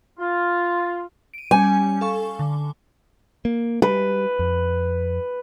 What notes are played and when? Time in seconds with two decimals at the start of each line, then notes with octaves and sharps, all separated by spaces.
0.19 F4
1.34 D7 D#7
1.51 G3 C#4 G#5
2.01 A4 F5 C#6
2.39 D3
3.45 A#3
3.82 G3 B4
4.39 F2